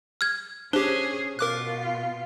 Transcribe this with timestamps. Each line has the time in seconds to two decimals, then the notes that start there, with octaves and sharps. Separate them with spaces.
0.21 F6 G#6
0.73 C#4 D4 G4 G#4 C5
1.39 B2 F4 A#4 D6 F#6